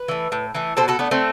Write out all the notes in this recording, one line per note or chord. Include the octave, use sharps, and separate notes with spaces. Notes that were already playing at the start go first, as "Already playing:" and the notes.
Already playing: B4
E3 A3
A2
E3 A3
B2 A4 C5
F#4 A4
A3 B3 D4
A3 C4